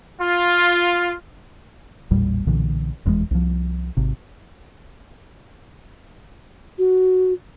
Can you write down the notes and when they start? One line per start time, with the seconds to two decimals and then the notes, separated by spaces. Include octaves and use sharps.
0.21 F4
2.11 A1 E2 A#2 G3
2.46 B1 A#2 D3 E3
3.05 F1 E2 G#2 G#3
3.31 C2 F3
3.97 G#1 C3
6.78 F#4